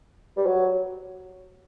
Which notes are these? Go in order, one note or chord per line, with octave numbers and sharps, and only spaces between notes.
G3
F#3